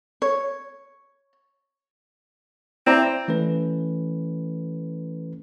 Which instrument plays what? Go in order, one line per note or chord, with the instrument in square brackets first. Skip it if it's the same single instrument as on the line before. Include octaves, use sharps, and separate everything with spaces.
[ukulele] C#5
[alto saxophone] C4 [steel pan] E4 D5 A#5
[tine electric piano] E3 A3 C#4 B4